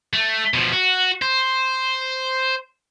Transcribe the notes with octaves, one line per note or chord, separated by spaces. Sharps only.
A3
B2 F3
F#4
C5